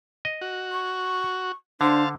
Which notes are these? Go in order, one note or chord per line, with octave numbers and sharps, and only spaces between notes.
D#5
F#4
C#6
D3 D4 C5 F5 A5